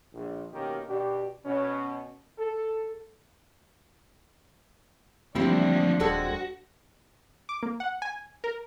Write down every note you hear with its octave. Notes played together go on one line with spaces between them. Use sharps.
A#1
B2 D#3 A#3 C#4 G4 A#4
B2 D4 G4
B2 C#4
A4
D2 E3 F3 G3 A#3 C4 D4 E4
D#1 F2 G#3 F#4 A4
D6
A#3
F#5
G#5
A#4